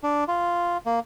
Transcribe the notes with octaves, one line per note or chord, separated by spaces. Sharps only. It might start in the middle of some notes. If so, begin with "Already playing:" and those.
D4
F4
A#3